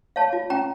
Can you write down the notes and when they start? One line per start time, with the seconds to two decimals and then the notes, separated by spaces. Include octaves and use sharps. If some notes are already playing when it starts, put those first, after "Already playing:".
0.16 C#5 F5 A5
0.33 F4
0.50 C#4 G5 A#5